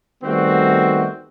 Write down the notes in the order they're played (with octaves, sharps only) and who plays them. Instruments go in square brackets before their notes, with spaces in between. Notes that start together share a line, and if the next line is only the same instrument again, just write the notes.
[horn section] D#3 G3 A3 B3 C4 F#4